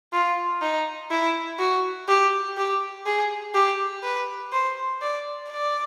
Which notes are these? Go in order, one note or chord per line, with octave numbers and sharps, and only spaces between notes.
F4
D#4
E4
F#4
G4
G4
G#4
G4
B4
C5
D5
D5